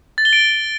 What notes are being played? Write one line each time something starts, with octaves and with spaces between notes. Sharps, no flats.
A6
G7
D7